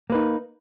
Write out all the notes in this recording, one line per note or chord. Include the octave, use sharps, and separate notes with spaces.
A#3 D#4 B4